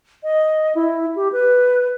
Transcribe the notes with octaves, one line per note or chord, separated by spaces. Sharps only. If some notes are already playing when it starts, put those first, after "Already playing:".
D#5
E4
G4
B4